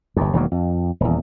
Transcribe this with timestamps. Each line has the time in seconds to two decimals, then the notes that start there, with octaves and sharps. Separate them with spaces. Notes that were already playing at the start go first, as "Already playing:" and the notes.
0.16 G1 D#2
0.33 E1 D#3 F#3 A#3
0.52 F2
1.00 D#1 E2